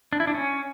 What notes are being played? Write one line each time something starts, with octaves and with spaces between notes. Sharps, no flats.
D4
E4
D4
C#4